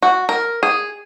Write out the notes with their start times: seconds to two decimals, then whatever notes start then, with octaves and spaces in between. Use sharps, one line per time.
0.02 F#4
0.29 A#4
0.63 G#4